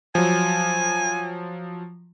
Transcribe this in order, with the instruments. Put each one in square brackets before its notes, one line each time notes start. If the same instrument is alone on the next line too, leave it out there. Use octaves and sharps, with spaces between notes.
[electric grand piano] F3 F#3 [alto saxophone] G#5